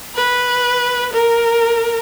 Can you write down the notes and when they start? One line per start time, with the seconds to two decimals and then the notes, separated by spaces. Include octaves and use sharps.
0.15 B4
1.13 A#4